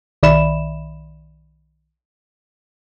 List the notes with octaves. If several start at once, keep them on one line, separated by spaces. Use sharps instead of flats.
B1 D#3 D5 E5 B5 E7